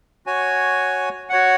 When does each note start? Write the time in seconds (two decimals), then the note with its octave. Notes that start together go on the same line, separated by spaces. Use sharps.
0.26 F#4 C#5 G#5
1.30 F#4 C#5 F#5